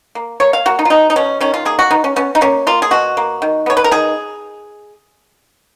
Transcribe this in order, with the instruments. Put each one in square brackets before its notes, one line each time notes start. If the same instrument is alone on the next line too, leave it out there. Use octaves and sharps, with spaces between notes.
[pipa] A#3
A#3 C#5
F5
A#3 F#4
D#4
F4
B2 D#4
D#4
B2 C#4
D#3 C#4
F4
A#3 G#4
F#4
B3 D#4
C#4
B3 C#4
D#4
A#3 C#4
A#3 F4
G#4
B2 F#4
A#3
D#3
B3 C#5
B4
A#4
D#3 G#4